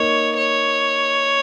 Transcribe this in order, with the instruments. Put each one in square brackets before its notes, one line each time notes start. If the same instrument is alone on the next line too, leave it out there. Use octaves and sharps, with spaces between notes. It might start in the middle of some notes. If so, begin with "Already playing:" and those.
Already playing: [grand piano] A#3 D#4 [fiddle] C#5
[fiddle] C#5